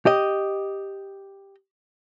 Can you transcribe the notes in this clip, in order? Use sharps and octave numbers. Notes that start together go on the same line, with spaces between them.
G4 D#5